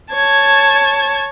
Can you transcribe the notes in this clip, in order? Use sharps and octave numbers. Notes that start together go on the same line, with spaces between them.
C#5 A5 G#6